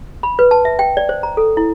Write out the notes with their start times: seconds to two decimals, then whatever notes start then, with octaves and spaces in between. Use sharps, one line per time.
0.23 B5
0.39 B4
0.51 A5
0.65 E5
0.79 G5
0.97 D5
1.09 C5
1.23 A#5
1.37 A4
1.57 E4